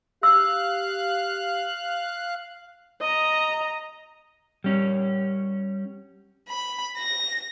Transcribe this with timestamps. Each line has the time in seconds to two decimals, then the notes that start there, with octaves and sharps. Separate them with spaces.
0.23 G4 F5 E6 F#6
3.01 D#5 A#5
4.64 G3 C#4
6.49 B5
6.97 A#6